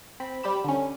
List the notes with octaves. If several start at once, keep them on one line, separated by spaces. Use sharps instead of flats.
C4 B5
G3 G4 B5 E7
D3 C#4